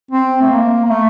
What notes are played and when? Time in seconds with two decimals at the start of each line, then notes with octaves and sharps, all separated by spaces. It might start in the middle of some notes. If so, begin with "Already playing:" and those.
0.11 C4
0.42 A3
0.51 A#3
0.85 A#3
0.90 A3